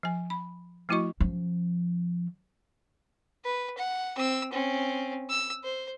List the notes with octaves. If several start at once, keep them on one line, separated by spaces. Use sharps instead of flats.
F3 G#5
B5
F3 A3 E4 F#4 D#5 C#6
F3 C#4
B4
F#5
C4 E6
C4 C#4
E6
C5